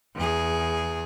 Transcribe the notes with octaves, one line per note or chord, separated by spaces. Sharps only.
E2 G#4